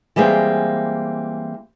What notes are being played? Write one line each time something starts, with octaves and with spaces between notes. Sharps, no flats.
E3 G3 G#3 A#3 C4